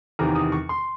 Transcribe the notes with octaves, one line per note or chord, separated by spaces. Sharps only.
E2 C3 D#3 A#5
D#6
C#6
C6